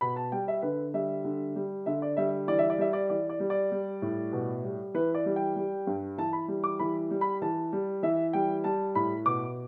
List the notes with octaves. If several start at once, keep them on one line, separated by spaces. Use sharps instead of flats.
B2 B5
A5
G3 G5
E5
D3 B4
G3 E5
D3
G3
D3 E5
D5
G3 E5
E3 D5
E5
D5
G3 E5
D5
E3 D5
D5
G3
D5
G3
A2
B2
G3
E3 B4
D5
G3
G5
G3
G2
E3 A5
B5
G3
D6
E3 B5
G3
B5
E3 A5
G3
E3 E5
G3 G5
G3 A5
A2 B5
B2 D6